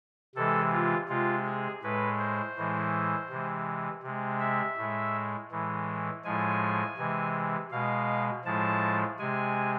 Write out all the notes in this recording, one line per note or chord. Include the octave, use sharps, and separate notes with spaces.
C3 E3 G#3 A4
F4
C3 G#3 F4
G#4
A2 G#3 B4
C5
A2 E3 G#3
C3 E3 G#3
C3 G#3
E5
A2 G#3
A2 E3 G#3
A2 F3 G#3 G#5
C3 E3 G#3
B2 G#3 F5
A2 F3 G#3 A5
C3 G#3 G#5